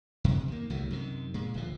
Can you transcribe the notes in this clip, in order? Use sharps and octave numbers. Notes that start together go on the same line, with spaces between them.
F2 C3
D#3 A#3
C2 D#3 F#3 A3
F#2 C3 D#3
A#2 G#3
D1 D3 F3